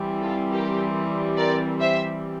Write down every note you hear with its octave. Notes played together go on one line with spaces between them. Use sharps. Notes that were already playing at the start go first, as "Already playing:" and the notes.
Already playing: E3 G3 C4
F4 A4
G4 A#4
A#4 D5
C5 E5